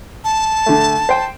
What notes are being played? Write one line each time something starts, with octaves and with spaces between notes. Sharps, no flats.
A5
D3 A3
C5 G5